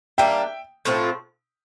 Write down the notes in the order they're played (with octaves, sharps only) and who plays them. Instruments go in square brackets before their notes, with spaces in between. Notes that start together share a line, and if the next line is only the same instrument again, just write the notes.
[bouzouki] G3 A#3 D4 [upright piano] E5 G5
[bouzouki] A2 F3 C4 F4